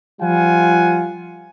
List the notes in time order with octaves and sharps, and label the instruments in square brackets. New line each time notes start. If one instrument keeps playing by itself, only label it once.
[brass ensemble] F3 G3 F4 F#5 G#5